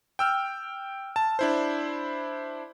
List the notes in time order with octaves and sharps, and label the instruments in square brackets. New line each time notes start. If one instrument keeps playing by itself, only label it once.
[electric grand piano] G5 E6 F6
A5
D4 E4 C5